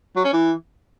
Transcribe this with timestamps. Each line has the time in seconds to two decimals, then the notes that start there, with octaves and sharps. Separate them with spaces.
0.16 F#3
0.25 C#4
0.33 E3